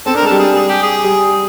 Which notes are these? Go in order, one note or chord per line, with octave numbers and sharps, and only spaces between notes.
C4 A4
D4 A#4
G#3
A4
G3
G#4
G#4
G4
G#4
G3